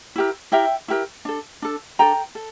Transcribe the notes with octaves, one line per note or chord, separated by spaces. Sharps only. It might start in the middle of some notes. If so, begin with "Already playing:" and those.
E4 G4 A#4
E4 G4 A#4 E5 G5
E4 G4 A#4
D4 A4
D4 A4
D4 A4 G5 A#5
A4